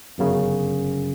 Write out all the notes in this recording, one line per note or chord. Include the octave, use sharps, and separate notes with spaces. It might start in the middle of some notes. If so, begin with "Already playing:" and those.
G1 F#2 C#3